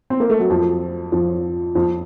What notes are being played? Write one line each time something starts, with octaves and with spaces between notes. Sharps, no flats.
C4
A#3
A3
F#3
F2 F3
F2 F3
F2 F3